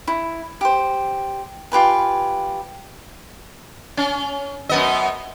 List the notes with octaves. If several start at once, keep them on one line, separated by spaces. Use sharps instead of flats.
E4
G4 C5
F4 G4 B4 G#5
C#4
F#2 B3 D#5